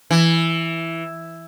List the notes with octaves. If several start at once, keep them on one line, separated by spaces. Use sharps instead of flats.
E3